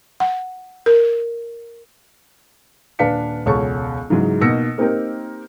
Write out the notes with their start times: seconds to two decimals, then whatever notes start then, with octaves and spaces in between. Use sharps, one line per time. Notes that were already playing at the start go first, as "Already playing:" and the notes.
0.20 F#5
0.86 A#4
2.99 D#1 D4 B4 F5 B6 C#7
3.46 E1 C#2 A4 C#5 A5 C#6
4.10 G#2 C#3 E3 F#3 G#3
4.41 B2 A#3 D#4 E6 A#6 C#7
4.78 A#3 C4 D#4 G4 A#4